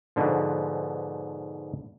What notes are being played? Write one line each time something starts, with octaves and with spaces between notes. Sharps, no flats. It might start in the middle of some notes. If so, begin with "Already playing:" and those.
G#2 B2 D3 F3